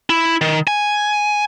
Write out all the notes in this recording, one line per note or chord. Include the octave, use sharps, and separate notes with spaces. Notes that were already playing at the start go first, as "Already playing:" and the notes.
E4
D#3
G#5